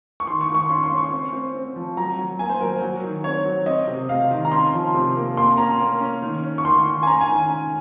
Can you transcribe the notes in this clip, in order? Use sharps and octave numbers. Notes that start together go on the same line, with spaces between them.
C#6
D#3 C6
C#6
D#3
C#6
C#4 C6
C6
C#4
C#6
C4
C4
C4
F3
F#3 A#5
F#3
A#3 G#5
C5
F#3 A#4
F#3
D#3
C4 C#5
F#3
C4 D#5
C3
C3 F5
D#3
A#5
C#4 C6
F3
C3
A#3
A#3 C6
C#4 A#5
A#3
C#4
D#3
C#4
C#6
D#3 C6
D#3
G#5
C#4 A#5
G#5
D#3
C#4